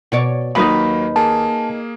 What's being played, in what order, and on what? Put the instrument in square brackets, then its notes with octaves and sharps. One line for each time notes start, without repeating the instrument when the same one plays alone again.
[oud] B2 C#5 D5
[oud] D#2 [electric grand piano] F#3 A#3 [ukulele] D#4 B4 B5
[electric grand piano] A#3 G#4 [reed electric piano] A5